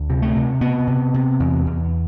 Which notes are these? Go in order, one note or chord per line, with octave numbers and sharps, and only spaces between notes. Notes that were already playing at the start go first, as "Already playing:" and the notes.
Already playing: D2
C3
A3
C3
C3 B3
C3
C3
E2
E2